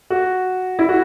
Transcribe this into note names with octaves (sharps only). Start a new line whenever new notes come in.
F#4
E4
F#4